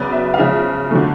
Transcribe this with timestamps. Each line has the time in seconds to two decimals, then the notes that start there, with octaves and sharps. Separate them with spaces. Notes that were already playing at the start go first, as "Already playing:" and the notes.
Already playing: C#3 F#3 B3 D5
0.12 E5
0.34 F5
0.38 C#3 F3 G#3 E5
0.91 D3 F#3 A3